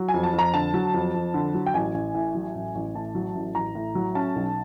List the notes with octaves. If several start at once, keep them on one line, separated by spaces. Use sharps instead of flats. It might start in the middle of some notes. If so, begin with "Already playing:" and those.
Already playing: F#3
G#5
F2
A5
F2
A#5
D3 A5
F#3
F2
F2
D3
F#3
G5
A1 G#5
A1
A2
F#3
A1
A1
A2 A5
F#3
A1
A1 A#5
A2
F#3
C#4 A5
B1